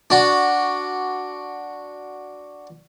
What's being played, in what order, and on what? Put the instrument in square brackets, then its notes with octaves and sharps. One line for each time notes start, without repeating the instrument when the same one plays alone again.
[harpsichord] D4 F#4